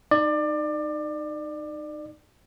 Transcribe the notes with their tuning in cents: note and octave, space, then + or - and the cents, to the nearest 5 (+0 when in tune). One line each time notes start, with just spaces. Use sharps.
D#4 -20 D5 +25